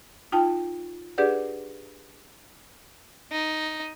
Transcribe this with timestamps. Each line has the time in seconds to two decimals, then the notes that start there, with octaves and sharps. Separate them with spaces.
0.32 D#4 F4 G5 A5
1.18 D4 G4 G#4 B4 D5 F#5
3.32 D#4